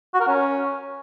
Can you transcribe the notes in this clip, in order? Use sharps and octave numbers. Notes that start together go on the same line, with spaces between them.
F#4
A#4
C#4